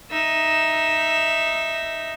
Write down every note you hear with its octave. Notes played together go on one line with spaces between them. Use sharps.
D#4 E5